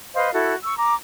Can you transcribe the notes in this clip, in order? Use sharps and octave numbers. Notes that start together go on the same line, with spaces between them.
B4 C5 D#5 F5
E4 F#4 A4
C#6 E6
A#5 D6